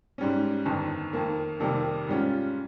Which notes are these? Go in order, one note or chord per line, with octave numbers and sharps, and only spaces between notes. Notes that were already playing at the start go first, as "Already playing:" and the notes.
G#2 G3 C#4
G1 F2 D#3
F2 D#3 A#3
F2 C3 D#3 G3 A#3
G#2 G3 C#4 F4